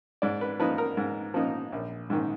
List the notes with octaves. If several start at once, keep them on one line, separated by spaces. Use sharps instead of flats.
G#2 D5
B4
F3 A#3 D#4 B4
A#4
G#2
F3 A#3 D#4
A#1
G#2 D#3